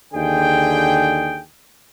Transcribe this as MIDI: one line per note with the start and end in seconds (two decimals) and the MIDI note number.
0.13 1.42 39
0.13 1.42 50
0.13 1.42 68
0.13 1.42 79